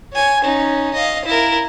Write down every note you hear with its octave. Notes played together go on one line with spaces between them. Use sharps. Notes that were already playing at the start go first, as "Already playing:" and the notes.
C#5 G#5
C#4 D#4
D#5 F5
E4 A#4